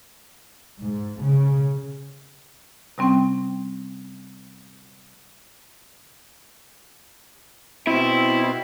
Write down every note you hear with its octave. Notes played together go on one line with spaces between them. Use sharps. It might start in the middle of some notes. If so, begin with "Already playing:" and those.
G#2
C#3
C3 G3 C4 C#4 G5
B2 C4 E4